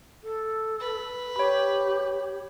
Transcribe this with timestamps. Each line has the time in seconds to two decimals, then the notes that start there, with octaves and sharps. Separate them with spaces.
0.23 A4
0.80 B4
1.36 G4 C#5 B5